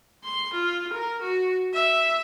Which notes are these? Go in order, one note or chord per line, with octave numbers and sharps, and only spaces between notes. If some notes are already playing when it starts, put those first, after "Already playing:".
C6
F4
A#4
F#4
E5